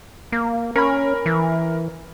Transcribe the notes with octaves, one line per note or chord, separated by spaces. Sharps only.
A#3
C#4 A#4 B5
E3